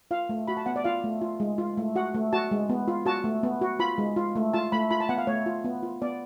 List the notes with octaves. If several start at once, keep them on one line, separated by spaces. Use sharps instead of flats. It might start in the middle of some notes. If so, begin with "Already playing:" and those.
F4 F5
A3
F#4 B5
A5
B3 F#5
D5
F4 F5
A3
F4
G#3
F4
A3
F#4 F#5
A3
F#4 A5
G#3
B3
F4
F#4 A5
A3
B3
F#4
F4 B5
G#3
F4
A3
F4 A5
A3 B5
F4 B5
A5
B3 F#5
F5
A3 C#5
F4
B3
F4
B3 D5